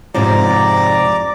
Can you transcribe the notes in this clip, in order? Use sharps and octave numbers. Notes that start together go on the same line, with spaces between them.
F2 G#2 C3 D5 A#5 D6